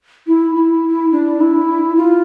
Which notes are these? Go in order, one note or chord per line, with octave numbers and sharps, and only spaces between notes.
E4
E4
D4
E4
F4